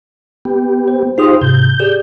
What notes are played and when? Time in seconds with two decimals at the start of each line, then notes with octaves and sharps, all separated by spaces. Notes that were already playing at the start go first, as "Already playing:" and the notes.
0.45 B3 G4
0.88 C5
1.18 D#4 F4 G4 G#4 C5 D#6
1.41 G#2 C3 G6
1.80 G4 G#4 D5